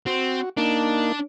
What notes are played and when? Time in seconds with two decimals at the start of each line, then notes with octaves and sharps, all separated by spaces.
0.06 C4 F#4
0.57 A#3 D4 D#4